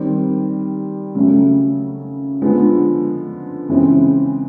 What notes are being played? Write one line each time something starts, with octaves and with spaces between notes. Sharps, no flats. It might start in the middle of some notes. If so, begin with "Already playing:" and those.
Already playing: D#3 G3 C4
C#3 F#3 A3
D3 F3 G#3 B3
C#3 E3 G#3 C4